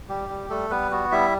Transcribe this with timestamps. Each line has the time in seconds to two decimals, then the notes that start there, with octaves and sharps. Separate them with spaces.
0.09 G3 G4
0.29 G3
0.50 G3 A3 A4
0.70 G3 B3 B4
0.91 B3 F#4
1.12 G3 E4 E5